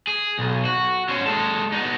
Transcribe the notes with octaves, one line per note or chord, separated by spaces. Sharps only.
G#4
B1
F#4
C#4 C5
G#3 A4
B3 D#4